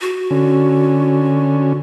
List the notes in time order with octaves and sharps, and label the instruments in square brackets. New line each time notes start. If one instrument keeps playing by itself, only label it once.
[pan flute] F#4
[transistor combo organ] D3 C#4